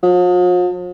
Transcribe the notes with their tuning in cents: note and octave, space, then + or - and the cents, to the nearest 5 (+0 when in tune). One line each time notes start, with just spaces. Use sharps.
F3 +45